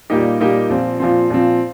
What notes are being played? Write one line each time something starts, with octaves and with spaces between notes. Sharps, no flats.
A#2 G3 A#3 D#4 G4
A#2 G3 A#3 D#4 G4
A#2 F3 C4
A#2 F3 C4
A#2 F3 C4